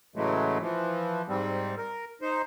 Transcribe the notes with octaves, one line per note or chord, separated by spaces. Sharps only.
A2 C#3 E3 F#3 G#3 A3
E3 F3
G#2 G3 C4
A#4
D#4 C5